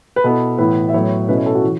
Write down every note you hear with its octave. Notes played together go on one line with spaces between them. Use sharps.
B4
B2 B3 E4 A4
A2 E3 B3 E4 B4
E5
A2 F#3 B3 E4 C#5
B2 A3 C#4 E4 B4
C#5
A4
F#4
E3